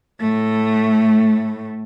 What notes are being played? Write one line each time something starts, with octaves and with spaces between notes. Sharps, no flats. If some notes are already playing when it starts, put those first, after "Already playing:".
A2 A3